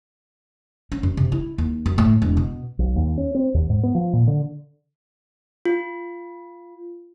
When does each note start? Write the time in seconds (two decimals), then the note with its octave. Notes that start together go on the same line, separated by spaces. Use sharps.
0.92 C#4
1.03 F#2
1.17 C3
1.32 E4
1.58 D#2
1.86 F#2
1.98 A2
2.22 E1
2.37 B2
2.79 B1
2.96 D#2
3.18 C#4
3.35 C4
3.54 D#2
3.69 G#2
3.83 B3
3.95 F3
4.13 A#2
4.27 D3
5.65 F4